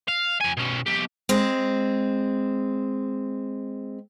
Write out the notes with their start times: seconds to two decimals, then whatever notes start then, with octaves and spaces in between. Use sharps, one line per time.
0.08 F5
0.40 F2 G#5
0.57 B2 C#4
0.86 B1 G4
1.29 G#3 C4